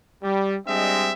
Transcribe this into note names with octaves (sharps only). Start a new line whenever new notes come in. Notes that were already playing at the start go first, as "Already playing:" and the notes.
G3
G3 G#3 C4 D4 D#5 E5